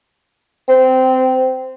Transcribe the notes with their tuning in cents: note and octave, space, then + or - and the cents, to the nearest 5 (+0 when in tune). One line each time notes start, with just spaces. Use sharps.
C4 -15